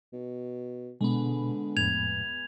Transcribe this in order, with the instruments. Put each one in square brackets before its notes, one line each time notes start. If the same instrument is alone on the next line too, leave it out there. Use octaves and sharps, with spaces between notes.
[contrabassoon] B2
[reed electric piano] B2 [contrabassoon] D3 [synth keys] G#3 B3
[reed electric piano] F2 A2 [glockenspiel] G#6 F7